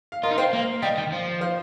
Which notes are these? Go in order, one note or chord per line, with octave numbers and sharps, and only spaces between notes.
F5
F4 A#4 D#5
D#4
C4 C5 F5
A#3
G3 D#5 G5
D#3
F3
C5 F5